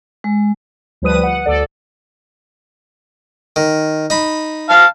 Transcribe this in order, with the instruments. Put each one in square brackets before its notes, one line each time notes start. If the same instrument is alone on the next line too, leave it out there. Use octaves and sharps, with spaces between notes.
[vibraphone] G#3
[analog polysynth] D2 F3 G3 B4 D#6 D#7
F#5
D2 A4 D5
[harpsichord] D#3
D#4 B5
[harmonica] F5 A5 F6